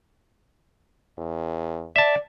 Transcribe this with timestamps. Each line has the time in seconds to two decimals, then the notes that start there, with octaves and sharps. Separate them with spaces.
1.18 E2
1.96 D5 E5 A5